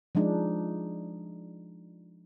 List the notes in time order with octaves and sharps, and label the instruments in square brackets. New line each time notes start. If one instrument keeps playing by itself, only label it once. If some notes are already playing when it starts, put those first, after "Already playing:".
[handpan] F3 G#3 D4 D#4